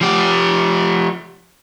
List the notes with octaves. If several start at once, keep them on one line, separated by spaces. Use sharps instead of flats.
F3 G4